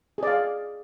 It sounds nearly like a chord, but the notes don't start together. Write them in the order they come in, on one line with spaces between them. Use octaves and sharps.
G#4 D5 F5